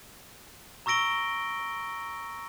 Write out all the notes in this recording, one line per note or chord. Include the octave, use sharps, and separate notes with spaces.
A#5 C#6 E6 A#6 D7 G7